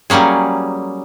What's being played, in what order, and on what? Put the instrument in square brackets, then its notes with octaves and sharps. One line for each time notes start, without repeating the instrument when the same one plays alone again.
[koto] F#3 G3 A#3 C#4 G#4